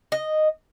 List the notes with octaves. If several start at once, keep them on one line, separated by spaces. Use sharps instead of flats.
D#5